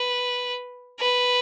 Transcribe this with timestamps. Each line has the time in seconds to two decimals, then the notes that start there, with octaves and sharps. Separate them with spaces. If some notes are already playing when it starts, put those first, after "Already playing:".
Already playing: B4
1.00 B4